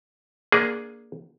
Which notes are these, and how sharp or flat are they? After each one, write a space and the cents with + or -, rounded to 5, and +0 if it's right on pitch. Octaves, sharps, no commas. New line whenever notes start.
A#3 +5 D4 -5 G#4 +0